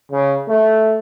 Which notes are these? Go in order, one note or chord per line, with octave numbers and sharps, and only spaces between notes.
C#3
A3